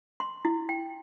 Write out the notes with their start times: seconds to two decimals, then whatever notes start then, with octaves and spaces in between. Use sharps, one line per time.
0.20 C6
0.45 E4
0.69 G5